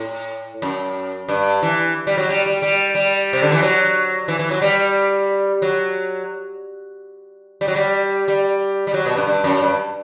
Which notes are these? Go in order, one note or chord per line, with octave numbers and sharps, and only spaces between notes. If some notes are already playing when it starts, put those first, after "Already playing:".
Already playing: A2
F#2
G2
E3
G3
F#3
G3
G3
G3
G3
C3
D3
E3
F#3
E3
E3
F#3
G3
F#3
G3
F#3
G3
G3
G3
F#3
B2
G2
G2
F#2
G2